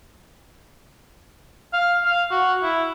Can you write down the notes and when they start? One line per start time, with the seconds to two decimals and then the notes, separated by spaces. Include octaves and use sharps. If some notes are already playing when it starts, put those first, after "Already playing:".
1.73 F5
2.05 F5
2.31 F#4
2.62 E4